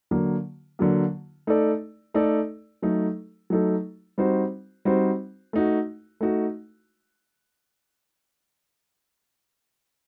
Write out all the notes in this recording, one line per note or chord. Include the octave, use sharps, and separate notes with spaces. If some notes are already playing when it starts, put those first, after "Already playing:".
D3 F#3 A#3
D3 F#3 A#3
A3 D#4 A4 D5
A3 D#4 A4 D5
F#3 A3 D#4 A4
F#3 A3 D#4 A4
G3 C4 D#4 F#4 C5
G3 C4 D#4 F#4 C5
A3 D#4 F#4
A3 D#4 F#4